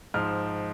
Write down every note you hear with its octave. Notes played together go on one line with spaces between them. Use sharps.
G#2 F3 F6